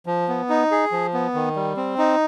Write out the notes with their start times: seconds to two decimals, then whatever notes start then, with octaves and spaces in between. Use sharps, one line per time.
0.06 F3
0.28 B3
0.49 D#4
0.71 G#4
0.92 F3
1.14 B3
1.34 D#3
1.56 G3
1.77 C4
1.98 D#4